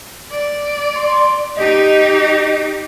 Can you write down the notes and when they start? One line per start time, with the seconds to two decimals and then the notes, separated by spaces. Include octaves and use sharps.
0.30 D5
0.96 C6
1.57 D#4 G4 D#5